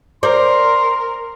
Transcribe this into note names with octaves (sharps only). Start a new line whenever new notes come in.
A#4 C5 D5 C6